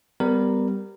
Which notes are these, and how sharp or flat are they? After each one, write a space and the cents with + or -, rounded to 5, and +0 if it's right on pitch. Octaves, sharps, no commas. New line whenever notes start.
G3 +0 B3 +25 A#4 -15